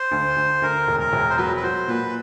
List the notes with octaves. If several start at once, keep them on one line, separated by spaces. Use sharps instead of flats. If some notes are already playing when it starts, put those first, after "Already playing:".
Already playing: C5
D2
D2
D2 A#4
E1
A#4
E1
C5
F#3 B4
B4
F#3 C5
A#2 B4